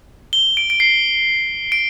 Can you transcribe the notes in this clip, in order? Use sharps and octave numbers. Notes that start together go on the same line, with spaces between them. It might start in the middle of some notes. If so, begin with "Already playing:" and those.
G7
D7
D7
C7
D7